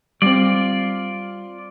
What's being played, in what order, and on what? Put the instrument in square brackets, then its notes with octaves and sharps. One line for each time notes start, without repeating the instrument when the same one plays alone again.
[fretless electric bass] G3 A#3 C4 [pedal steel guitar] F4 D5